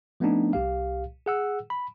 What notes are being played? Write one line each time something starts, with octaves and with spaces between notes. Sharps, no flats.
F3 A3 B3 C4 D4 D#4
C2 G4 F5
G#4 F#5 E6
B5